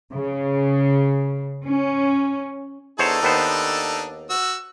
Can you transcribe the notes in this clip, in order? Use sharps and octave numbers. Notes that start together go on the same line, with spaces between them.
C#3
C#4
E2 D4 D#4 A4 C5 C#5
D#2 B3 C5
F#4 E6